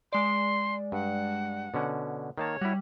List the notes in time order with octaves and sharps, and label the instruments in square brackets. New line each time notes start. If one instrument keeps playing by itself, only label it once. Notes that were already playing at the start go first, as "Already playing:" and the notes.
[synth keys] G#3 D5 [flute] C6
[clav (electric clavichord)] G2 [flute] F#5
[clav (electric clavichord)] B2 D3 C#4
[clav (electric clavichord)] D#3 A#3 A5 [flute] C#5
[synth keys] G3 [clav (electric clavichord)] E4 F#4